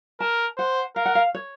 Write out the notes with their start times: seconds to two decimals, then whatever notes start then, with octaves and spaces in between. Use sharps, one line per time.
0.20 A#4 A5
0.58 C5 F#5
0.96 A#4 F5
1.06 F#5
1.15 F5
1.35 C#5